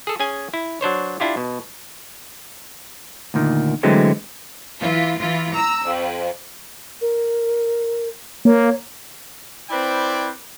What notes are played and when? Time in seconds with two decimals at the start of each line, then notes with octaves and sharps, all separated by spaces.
0.07 G#4 A4
0.20 C#4 G#4 G#5
0.54 E4
0.81 F#3 D4 C5 C#5
1.20 D4 E4 F4 G4
1.37 B2
3.34 D2 A#2 D#3
3.83 D3 E3 F#3 G#3 A3 C4
4.81 E3 F4
5.19 E3 F4
5.53 A#5 E6
5.85 F2
7.01 A#4
8.45 A#3 C#5
9.70 C4 E4 B4 C5 D5 G5